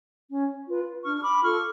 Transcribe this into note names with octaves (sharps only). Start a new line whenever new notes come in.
C#4
F4 B4
D4 C#6 F6
F6
B5 D6
F4 A4 C#6 F6